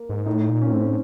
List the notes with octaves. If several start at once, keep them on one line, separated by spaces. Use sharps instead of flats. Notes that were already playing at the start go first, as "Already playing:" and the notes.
Already playing: A#3
G#2
A2 D#4
A#2
C#4
A2 C4
C#4